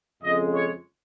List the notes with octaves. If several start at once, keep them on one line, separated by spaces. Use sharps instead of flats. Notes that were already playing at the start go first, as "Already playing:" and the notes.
F2 C#3 G#3 D#5
C#5